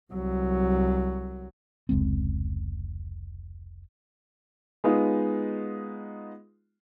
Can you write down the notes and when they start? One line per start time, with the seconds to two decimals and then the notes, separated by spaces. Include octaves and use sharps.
0.13 C2 F#3
1.89 F1 C#2 G#3 C4
4.84 G#3 B3 D#4 F4